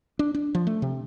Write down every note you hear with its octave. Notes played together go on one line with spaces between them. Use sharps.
D4
D4
F3
A3
C3